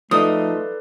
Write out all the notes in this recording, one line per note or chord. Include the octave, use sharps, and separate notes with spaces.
F3 A3 D#4 A4 B4 D5 D#6